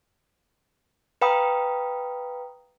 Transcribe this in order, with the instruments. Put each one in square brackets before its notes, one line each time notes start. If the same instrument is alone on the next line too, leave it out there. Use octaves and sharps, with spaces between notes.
[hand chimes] B4 F5 G5 A#5 B5 D#6